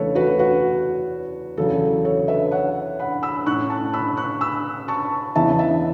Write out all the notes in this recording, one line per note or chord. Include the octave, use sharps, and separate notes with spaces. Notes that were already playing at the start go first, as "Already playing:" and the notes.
Already playing: E2 C#3 A3 A4 B4 C#5
F#4 B4
F#4 B4
E2 C#3 F#3 A4
A4 C#5
B4 E5
C#5 F#5
F#5 B5
B5 E6
A2 A3 C#4 C#6 F#6
A5 C#6
B5 E6
C#6 F#6
B5 E6
A5 C#6
E2 C#3 E3 B3 E5 A5
E5 A5